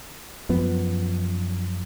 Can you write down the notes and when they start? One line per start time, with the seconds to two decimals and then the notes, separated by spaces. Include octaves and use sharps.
0.49 F#2 F3 B3